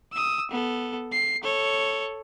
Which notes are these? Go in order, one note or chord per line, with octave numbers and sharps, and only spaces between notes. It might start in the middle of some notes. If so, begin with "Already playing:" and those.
D#6 E6
B3 A4
C7
A4 C#5